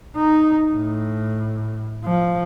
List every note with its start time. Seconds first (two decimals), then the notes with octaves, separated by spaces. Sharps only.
0.17 D#4
0.74 A2
2.04 F3